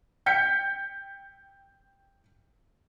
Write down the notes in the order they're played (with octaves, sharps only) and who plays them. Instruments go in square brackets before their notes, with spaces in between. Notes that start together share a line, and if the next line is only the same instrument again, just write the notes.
[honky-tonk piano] G5 G6 B6 C#7